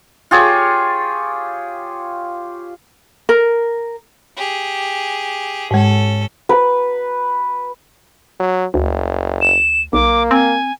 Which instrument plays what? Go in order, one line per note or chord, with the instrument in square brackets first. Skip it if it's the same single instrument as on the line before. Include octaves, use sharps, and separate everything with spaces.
[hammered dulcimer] F4 G4 G#4 C#5
[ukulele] A#4
[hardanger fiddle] G4 G#4
[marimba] G#2 G#3 [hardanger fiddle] C#4 A4
[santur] B4
[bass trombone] F#3
[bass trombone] F#1 [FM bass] D2
[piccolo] E7
[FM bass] B1 [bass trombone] A#3 [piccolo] D6
[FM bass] C4 [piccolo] G#5